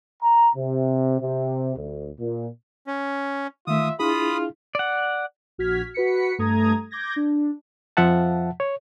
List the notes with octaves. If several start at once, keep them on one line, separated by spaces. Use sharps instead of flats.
A#5
C3
C3
D2
A#2
C#4
D#3 A3 F4 E5 D#6
D4 E4 F4 G#4 B5 D#6
D5 F#5
A#1 F#4 F6 G#6 B6
F#4 B4 B6 C#7
G2 A3 A4 A#5 D#6 G#6
D6 G6 G#6 A#6
D4
F2 F3 E5 F#5 A5
C#5